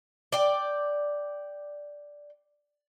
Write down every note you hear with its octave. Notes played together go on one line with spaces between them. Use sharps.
D5 G5